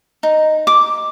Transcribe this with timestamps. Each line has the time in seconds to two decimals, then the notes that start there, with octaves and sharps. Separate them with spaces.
0.23 D#4
0.67 D6